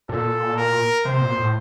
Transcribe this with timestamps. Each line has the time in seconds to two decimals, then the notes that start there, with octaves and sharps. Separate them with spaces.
0.09 A#2 A4
0.57 A#4
1.05 C3 C5
1.21 A#2
1.37 A2